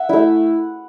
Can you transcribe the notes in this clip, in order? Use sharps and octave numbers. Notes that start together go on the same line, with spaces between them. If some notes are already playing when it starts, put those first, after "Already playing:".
Already playing: E5 F#5
A3 E4